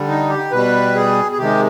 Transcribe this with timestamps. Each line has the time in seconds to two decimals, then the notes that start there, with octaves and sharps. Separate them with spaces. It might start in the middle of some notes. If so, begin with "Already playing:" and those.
Already playing: D3 G3
0.08 D#4
0.29 G4
0.52 B2 G3 B4
0.95 G#4
1.32 G#4
1.38 C3 D#3 G#3 G4